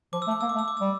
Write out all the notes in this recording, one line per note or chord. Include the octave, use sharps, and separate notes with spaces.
F3 D6
E6
A3
D6
A#3 E6
D6
A3
E6
D6
G3 E6